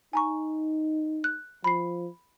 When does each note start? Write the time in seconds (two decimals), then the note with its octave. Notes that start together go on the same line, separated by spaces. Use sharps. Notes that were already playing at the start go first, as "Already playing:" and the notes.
0.13 D#4 G#5 A#5 C#6
1.24 F#6
1.64 F3 B5 C7